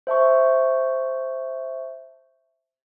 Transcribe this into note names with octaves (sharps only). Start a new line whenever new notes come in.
C5 E5 A5 C#6